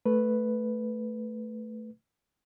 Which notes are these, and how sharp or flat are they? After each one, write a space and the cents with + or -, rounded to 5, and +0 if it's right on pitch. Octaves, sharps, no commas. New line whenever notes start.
A3 +0 B4 +0